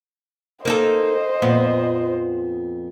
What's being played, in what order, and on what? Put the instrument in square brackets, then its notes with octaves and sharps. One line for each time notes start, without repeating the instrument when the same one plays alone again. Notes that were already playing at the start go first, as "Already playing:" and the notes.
[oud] A#3 D#4 A4 [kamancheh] C5 D#5
[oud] F2 A#2 B3